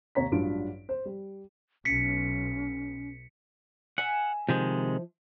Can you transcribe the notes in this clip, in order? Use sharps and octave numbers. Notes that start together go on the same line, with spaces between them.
D#2 C3 C#5 A#5 B6
A1 G2 F#3 D4 F4 D7
C5
G3
B1 C#4 B6 C#7
E5 F#5 G#5
C3 D#3 F3 G#3